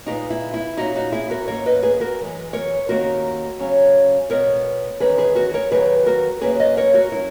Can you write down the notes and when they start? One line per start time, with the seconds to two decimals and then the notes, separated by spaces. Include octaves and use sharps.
0.06 A#2 G#3 B3 D#4 F#4
0.30 E4
0.54 E4
0.77 A#2 A#3 C#4 D#4 F#4
0.96 D#4 F#4
1.12 E4 G#4
1.30 F#4 A#4
1.47 G#2 D#3 A#3 C#4 A#4 C#5
1.66 B4 D#5
1.83 G#4 B4
2.00 F#4 A#4
2.19 F#2 E3 G#3
2.53 A#4 C#5
2.88 D#2 D#3 A#3 C#4 F#4 A#4
3.60 C#3 F#3 C#4
4.30 B2 G#3 B3 A#4 C#5
5.00 E2 D#3 G#3 C#4 G#4 B4
5.18 G#4 B4
5.35 F#4 A#4
5.54 A#4 C#5
5.71 D#2 D#3 F#3 B3 G#4 B4
6.06 F#4 A#4
6.41 F#2 C#3 E3 A#3 C#4 G#4 B4
6.60 B4 D#5
6.77 A#4 C#5
6.94 F#4 A#4
7.12 F#3 C#4 E4